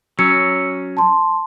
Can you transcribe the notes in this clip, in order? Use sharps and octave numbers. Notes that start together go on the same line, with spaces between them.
F#3 C#4 E6 C#7
A5 C6